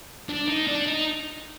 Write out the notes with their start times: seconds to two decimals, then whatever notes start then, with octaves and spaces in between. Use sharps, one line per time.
0.29 D4
0.48 D#4
0.67 D4
0.87 D#4